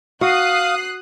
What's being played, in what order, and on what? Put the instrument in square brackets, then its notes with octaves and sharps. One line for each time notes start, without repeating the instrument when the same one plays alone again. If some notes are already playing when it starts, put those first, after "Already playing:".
[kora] F#4 [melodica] F5 [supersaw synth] D#6 [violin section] F#6 C7